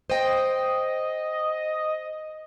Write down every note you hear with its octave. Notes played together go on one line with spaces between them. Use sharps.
C5 D#5 G5